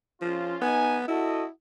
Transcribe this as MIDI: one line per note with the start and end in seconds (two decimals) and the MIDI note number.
0.21 0.56 53
0.21 0.58 61
0.21 0.58 65
0.62 1.06 59
0.62 0.98 63
0.62 0.98 80
1.08 1.49 64
1.08 1.44 66
1.08 1.44 69
1.08 1.44 75